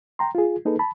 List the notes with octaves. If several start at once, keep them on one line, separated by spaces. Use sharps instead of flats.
G5 A#5 C6
F4 G#4
A#3 D#4 G#4 A4 B4
A5 B5